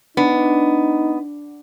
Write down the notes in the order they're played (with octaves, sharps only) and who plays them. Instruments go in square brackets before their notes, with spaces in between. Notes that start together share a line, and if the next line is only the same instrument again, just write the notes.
[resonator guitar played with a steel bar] B3 [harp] D4 [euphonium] D#4